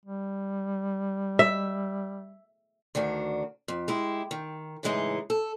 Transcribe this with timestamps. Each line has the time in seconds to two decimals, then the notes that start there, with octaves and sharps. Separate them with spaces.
0.06 G3
1.39 E5
2.95 D2 D#3 D4 F#4
3.68 F2
3.88 G#3 E4 G4
4.31 D#3
4.83 A2 C#3 E3 G#3 D#4
5.30 A4